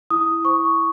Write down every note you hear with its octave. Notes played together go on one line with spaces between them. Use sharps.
E4 D#6
C5 C#6